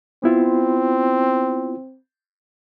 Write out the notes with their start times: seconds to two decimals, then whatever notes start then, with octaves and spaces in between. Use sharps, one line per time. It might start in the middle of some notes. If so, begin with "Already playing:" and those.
0.24 B3 C4 E4 F4